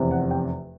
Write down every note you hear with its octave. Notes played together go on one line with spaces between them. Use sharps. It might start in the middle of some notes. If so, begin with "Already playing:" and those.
Already playing: F1 E2 C3
F#5
G5